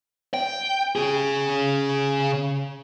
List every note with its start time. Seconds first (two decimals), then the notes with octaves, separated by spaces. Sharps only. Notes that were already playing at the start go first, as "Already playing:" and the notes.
0.34 G5
0.96 C#3 G#4